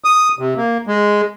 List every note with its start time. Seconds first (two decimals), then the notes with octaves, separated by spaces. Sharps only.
0.04 D#6
0.39 C3
0.57 A#3
0.87 G#3